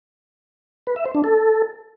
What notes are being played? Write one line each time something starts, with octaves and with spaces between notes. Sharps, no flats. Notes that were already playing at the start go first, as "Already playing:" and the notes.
B4
E5
C5
D4
A4